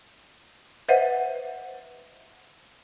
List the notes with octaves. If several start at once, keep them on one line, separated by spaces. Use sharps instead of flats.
B4 C5 D#5 E5 F#5